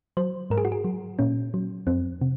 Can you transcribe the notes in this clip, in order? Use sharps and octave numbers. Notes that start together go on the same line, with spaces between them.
F#3 C5
G#2 A#4
G#4
F#4
G#4
F#3
A#2 C#4
F#3
F2 C4
C3